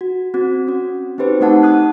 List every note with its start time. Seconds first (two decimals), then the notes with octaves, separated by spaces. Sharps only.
0.01 F#4
0.34 C4 F#4
0.67 C#4 F#4
1.18 C4 D#4 G4 B4 C5
1.40 A3 C4 D#4 F#5 A5
1.63 A5 D#6 F#6